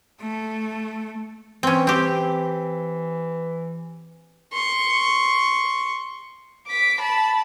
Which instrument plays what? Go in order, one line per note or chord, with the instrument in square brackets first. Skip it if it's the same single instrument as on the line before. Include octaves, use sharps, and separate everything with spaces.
[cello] A3
[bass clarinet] E3 [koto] C4 C#4
[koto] C4 G4
[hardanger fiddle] C6 C#6
[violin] D6 B6
A5 B5